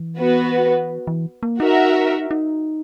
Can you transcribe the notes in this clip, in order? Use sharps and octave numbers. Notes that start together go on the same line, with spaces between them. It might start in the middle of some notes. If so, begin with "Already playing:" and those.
Already playing: E3
B3 F#4 B4
E3
A#3
D#4 F#4 A#4 E5
D#4